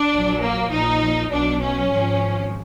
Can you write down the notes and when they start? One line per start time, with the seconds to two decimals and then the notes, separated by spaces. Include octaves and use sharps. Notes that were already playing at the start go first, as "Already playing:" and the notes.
Already playing: D4
0.12 A#1 A#2 F#3
0.42 A#3
0.71 A#1 A#2 F3 D#4
1.31 B1 B2 F#3 D4
1.61 C#4
1.90 G#1 G#2 F3